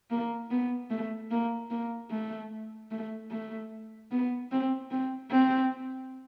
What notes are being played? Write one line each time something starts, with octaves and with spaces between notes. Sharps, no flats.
A#3
B3
A3
A#3
A#3
A3
A3
A3
B3
C4
C4
C4